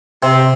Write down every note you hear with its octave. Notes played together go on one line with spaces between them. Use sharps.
C3 C4